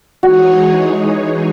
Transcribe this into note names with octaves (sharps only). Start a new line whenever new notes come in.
E3 G#3 D#4 F#4 G#4 C#5